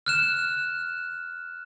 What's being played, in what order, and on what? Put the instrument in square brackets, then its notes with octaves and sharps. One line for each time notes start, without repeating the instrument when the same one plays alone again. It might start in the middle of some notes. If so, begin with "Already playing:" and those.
[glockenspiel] F6 F#6 E7